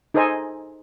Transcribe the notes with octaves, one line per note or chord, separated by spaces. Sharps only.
D#4 G#4 A4 C5 D#5 G#5